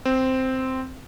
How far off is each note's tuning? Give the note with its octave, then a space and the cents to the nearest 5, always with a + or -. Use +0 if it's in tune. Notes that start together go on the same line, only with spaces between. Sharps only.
C4 -5